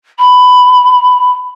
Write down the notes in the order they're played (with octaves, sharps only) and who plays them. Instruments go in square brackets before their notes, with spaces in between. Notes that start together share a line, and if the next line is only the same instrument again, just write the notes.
[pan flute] B5